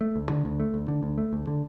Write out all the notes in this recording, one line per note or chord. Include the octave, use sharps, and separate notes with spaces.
A3
D2
D3
D2
A3
D2
D3
D2
A3
D2
D3